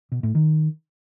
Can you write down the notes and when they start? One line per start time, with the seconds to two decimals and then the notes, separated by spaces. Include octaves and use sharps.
0.12 B2
0.23 A2
0.35 D#3